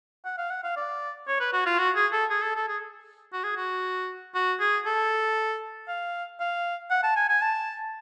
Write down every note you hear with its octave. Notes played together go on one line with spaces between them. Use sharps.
F#5
F5
F#5
F5
D5
C#5
B4
F#4
F4
F#4
G#4
A4
G#4
A4
A4
G#4
F#4
G#4
F#4
F#4
G#4
A4
F5
F5
F#5
A5
G#5
G#5
A5